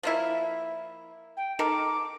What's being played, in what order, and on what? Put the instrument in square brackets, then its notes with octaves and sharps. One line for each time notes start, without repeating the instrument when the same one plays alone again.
[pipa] F3 A#3 E4
[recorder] G5
[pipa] D#4 A4 A#4 [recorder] D6